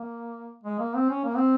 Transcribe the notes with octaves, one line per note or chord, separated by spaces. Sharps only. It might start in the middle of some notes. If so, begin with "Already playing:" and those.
Already playing: A#3
G#3
A#3
C4
C#4
A#3
C4